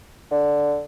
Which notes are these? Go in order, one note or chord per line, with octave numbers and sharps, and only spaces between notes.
D3